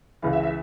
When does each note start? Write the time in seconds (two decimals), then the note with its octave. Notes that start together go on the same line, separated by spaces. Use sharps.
0.22 C#2 C#3 E3 F5
0.33 E5
0.43 E5